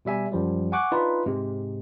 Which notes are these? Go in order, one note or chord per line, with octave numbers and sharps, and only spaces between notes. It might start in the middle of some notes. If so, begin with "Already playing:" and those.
B2 G3 E5 G#5
F#2 F3 G3
F#5 G#5 C#6 D6 F#6
D4 D#4 F4 B4
G#2 C3 G#3